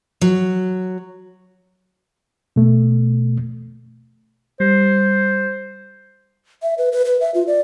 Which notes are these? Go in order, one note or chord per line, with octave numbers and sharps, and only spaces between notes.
F#3
B2 A3
G3 C5
E5
B4
B4
B4
E5
F4
D5